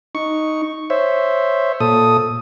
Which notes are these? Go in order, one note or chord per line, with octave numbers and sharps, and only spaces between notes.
D#4 C#6
C5 C#5 E5
A#2 A4 D#6